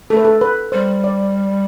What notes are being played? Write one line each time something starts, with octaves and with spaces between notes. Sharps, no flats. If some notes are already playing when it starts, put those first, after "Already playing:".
A3 A4
B4
A4
B4
G3 C5
D5